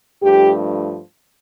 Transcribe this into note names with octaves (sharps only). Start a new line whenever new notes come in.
G2 F3 A3 G4